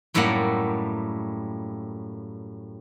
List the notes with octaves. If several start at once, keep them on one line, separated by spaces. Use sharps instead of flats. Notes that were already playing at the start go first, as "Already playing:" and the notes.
F#2 A2 G3 A3 A#3 F#5